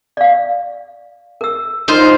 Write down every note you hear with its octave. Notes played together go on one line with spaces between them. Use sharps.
D5 F5
A#4 E6
D#4 F4 C5